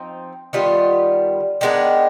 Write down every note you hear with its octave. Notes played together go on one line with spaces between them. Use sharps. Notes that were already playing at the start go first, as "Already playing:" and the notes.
Already playing: F3 C4 D#4
D#3 G3 B3 F4
D#3 G#3 B3 D4